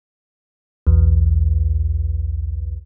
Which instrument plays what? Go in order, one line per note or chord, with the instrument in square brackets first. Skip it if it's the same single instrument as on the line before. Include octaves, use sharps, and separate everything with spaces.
[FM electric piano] B1 E2